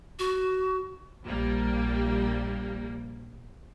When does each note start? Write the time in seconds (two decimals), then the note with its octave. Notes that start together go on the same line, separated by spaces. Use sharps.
0.19 F#4
1.25 A#1 G3 A#3